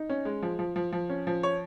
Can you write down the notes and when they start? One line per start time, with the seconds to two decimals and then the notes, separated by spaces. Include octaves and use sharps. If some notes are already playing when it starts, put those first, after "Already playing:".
Already playing: D#4
0.10 C#4
0.25 G#3
0.42 F3
0.59 F3
0.76 F3
0.92 F3
1.10 C#4
1.27 F3
1.43 C#5